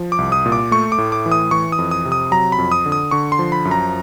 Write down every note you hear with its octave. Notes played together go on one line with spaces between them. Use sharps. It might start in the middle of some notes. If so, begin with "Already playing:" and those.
Already playing: F3
D6
C2
D#6
A#2
D6
A3 C#6
D6
A2
D6
E3
D#6
E3 C#6
D#6
F2
D#6
C3
D#6
F#3 A#5
B5
F2
D#6
D3
D#6
D3 C#6
C6
F3
B5
F#2
A#5